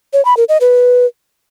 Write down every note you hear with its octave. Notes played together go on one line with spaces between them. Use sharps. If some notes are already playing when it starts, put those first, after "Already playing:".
C#5
B5
A#4
D#5
B4